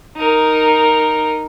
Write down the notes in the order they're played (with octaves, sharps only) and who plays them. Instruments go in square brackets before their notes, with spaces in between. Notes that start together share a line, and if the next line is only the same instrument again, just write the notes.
[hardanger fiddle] D#4 A#4